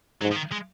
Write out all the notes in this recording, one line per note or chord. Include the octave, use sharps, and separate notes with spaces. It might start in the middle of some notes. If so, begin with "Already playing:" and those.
G#2 F#3
F3
D#3
G#3